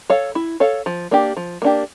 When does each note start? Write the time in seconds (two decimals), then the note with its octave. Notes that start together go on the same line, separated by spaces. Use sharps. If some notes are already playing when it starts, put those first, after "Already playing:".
0.10 A4 C#5 F5
0.35 E4
0.60 A4 C#5 F5
0.86 F3
1.11 A#3 D4 G4
1.37 F3
1.62 A#3 D4 G4